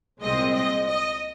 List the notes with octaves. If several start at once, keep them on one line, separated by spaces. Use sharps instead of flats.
C2 A#2 G#3 C4 D#5
D#5
D#5